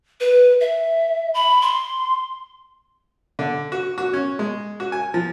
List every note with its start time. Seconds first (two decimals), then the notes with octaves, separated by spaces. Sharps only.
0.20 B4
0.61 E5
1.34 B5
1.62 C6
3.39 D3
3.72 F#4
3.98 F#4
4.13 C#4
4.39 G#3
4.80 F#4
4.92 G#5
5.14 F3